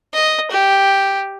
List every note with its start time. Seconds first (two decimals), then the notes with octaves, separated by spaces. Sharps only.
0.14 D#5
0.51 G4